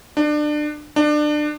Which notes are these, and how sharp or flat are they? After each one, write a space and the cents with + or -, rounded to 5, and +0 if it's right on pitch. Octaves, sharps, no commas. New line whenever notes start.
D4 +25
D4 +25